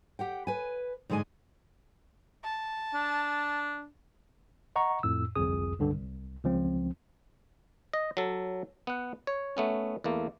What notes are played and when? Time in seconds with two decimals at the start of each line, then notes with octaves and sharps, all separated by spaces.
0.19 G4 F#5 G5
0.47 B4 G#5
1.10 G#2 D3 G#3 D#5 G#5
2.44 A5
2.94 D4
4.76 D#5 F#5 A#5 C#6
5.03 F2 A2 E6
5.35 G1 C2 F2 G#4 D#6
5.79 C#2 G2 D3
5.93 C2
6.44 C#2 F3 C4
7.93 D#5
8.17 F#3 A4
8.87 B3 F#5
9.27 C#5
9.57 A3 B3 C#4
10.04 E2 A3 A#3